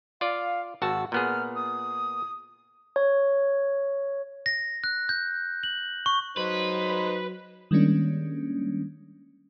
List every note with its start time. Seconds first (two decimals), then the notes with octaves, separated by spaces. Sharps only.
0.21 F4 D5 F5
0.82 G#1 F#4 A5 E6
1.12 A#2 B3 G#4 F6
1.55 D#6
2.96 C#5
4.46 A#6
4.84 F#6
5.09 G6
5.63 F#7
6.06 C#6
6.37 F#3 D#4 B4 C5
7.71 D#3 G3 G#3 A#3 C#4 D4